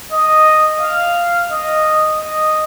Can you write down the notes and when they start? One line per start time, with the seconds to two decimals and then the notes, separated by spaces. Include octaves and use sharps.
0.12 D#5
0.81 F5
1.50 D#5
2.19 D#5